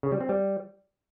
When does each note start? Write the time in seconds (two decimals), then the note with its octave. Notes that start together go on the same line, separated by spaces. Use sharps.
0.03 C#3
0.12 G3
0.20 C4
0.29 G3